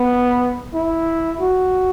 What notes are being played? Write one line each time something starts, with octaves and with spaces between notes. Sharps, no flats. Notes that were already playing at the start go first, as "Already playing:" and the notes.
Already playing: B3
E4
F#4